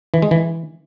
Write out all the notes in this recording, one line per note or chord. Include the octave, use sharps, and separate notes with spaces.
E3
G#3
E3